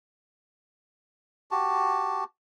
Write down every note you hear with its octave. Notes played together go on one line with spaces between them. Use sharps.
F#4 G4 A5